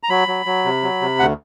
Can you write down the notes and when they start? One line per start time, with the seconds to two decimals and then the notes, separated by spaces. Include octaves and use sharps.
0.03 A#5
0.09 F#3 B5
0.28 F#3
0.46 F#3
0.65 C3
0.83 F#3
1.01 C3
1.19 D2 F#5